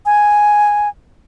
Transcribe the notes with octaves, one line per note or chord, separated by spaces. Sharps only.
G#5